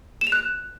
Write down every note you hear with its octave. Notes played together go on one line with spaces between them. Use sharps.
E7
F7
F#6